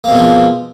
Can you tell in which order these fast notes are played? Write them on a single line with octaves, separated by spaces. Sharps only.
A#3 C4 B2 G#3 F3